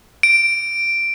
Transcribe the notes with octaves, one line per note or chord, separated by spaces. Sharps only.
D7